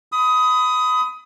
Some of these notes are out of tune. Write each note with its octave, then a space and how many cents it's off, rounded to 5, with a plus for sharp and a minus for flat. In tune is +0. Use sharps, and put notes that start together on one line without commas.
B5 +25 D#6 +15